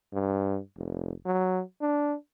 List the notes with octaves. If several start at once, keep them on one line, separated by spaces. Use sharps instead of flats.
G2
F1
F#3
D4